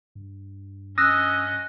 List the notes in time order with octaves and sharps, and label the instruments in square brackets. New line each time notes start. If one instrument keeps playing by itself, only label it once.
[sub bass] G2
[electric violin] C#4 D#5 [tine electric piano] D#6 E6 [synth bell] F#6 A#6